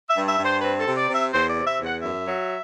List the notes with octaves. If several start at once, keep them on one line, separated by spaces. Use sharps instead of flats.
E5
G2
E5
G2
C5
C4 B4
A4
C3
D5
C3
E5
E2 C5
D5
C3
E5
E2
F#5
F#2 E5
F#3